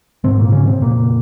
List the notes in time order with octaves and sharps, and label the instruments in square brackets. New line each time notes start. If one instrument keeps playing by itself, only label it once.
[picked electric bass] G#2 C3 C4
A#2 A#3
C#3 C#4
C3 C4
F2 A#2 C#3 A#3